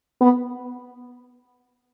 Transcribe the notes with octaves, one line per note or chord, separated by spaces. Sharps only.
B3